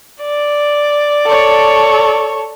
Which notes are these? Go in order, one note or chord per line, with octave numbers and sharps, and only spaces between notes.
D5
A4 C#5